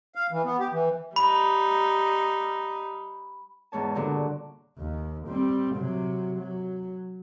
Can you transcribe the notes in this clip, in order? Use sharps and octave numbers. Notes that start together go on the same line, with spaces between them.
F5
E3
B3
G4
E3
G3 D#4 B5
E2 G#2 C#5 A5
G2 A#2 D3 F#4
D#2
G3 C4
C3 F#3
F#3